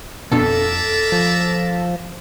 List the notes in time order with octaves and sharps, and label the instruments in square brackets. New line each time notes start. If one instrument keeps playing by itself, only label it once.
[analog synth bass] F2 [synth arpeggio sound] B2 B3 D4 [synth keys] A4 [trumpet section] A#4 D5 E5
[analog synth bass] F3